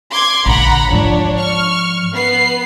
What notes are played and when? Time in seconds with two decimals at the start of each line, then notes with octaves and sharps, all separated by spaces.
0.11 C6 D6 G#6
0.46 A#1 D3 F#5 A#5 B5
0.90 G#2 F3 D4 C#5
1.37 C#6 F6
2.13 B3 C7